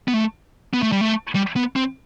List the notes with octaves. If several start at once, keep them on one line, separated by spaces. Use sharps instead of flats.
B3
A3
B3
A3
G3
A3
G3
B3
C4